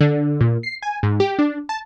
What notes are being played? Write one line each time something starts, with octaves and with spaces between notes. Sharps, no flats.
D3
A#2
C7
G#5
G#2
G4
D4
A5